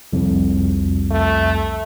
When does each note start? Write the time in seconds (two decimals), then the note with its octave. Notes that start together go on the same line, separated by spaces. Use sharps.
0.13 C2 F2
1.11 A3